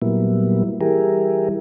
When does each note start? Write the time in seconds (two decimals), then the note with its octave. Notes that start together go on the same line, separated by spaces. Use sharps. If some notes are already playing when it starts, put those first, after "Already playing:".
0.01 A#2 F#3 G3 A#3 B3 E4
0.81 E3 G3 E4 G4 G#4 A#4